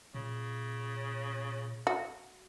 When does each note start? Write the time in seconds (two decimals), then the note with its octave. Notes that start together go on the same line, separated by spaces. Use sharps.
0.15 A#2 C#3
1.87 F#4